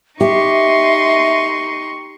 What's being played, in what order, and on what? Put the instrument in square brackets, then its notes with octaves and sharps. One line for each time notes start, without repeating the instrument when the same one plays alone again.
[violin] D#4 C6 [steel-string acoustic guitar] G4 [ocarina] E5 [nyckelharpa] C#6